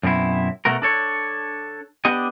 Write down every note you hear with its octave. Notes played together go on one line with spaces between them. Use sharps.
F#2 B2 C4 E4
B2 A3 F#4 A#4
D4 A4 C#5
B3 D4 G4 D#5